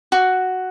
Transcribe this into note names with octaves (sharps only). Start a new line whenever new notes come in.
F#4